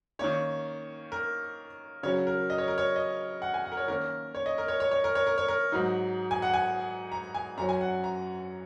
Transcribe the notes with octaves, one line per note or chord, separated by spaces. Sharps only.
D#3 A#3 C#4 C#5
A#4
C#3 F#3 C#4 C#5
A#4
D#5
C#5
A#4
C#5
D#5
F#5
G#5
F#5
A#4
C#5
D#3 A#3 C#4 A#4
C#5
D#5
A#4
C#5
C#5
C#5
A#4
C#5
A#4
C#5
A#4
G#2 F#3 D#4
G#5
F#5
G#5
A#5
G#5
F#2 F#3 C#4 A#5
G#5
F#5
A#5